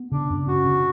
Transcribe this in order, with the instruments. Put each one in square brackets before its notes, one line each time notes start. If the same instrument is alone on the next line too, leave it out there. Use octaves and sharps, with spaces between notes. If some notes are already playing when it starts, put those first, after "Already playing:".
Already playing: [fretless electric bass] B3
[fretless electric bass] C#3 [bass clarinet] D4
[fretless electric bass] F#2
[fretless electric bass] C#4 [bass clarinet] F#4
[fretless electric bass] C#3